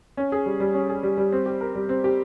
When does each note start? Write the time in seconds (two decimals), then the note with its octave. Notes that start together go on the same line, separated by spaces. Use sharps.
0.17 C#4
0.32 G#4
0.46 G3
0.60 G3
0.74 C#4
0.89 G#4
1.03 G3
1.18 G3
1.32 C4
1.46 G4
1.61 A#4
1.75 G3
1.89 C4
2.04 G4